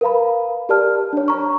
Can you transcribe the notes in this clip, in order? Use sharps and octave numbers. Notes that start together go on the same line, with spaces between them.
A#4 B4 F5 A#5 B5
G4 A#4 D5 A5 F6
D4 C#5
A#5 C#6